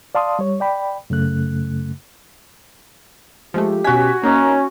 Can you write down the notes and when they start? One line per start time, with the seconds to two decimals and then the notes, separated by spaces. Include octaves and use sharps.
0.15 D5 F5 A5 C6 D#6
0.39 G3 C#5
0.60 D5 G5 B5
1.10 F#2 C#3 A3 F#6
3.54 F3 G#3 A3 G4
3.84 B2 C#4 F#4 G#5 B6
4.23 A#3 C#4 D#4 A#5